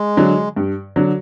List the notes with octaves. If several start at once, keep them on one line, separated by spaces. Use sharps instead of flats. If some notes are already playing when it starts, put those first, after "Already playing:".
Already playing: G#3
D3 F#3
G2
D3 F#3